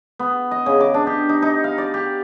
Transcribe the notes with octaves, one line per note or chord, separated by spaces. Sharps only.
B3
D#5
C#3
D6
D4
G4
D#4
D#4
F5
D5
G4